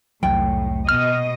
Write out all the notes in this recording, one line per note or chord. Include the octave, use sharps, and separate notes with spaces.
F1 C2 A2 F#3 G5
B2 D#5 F6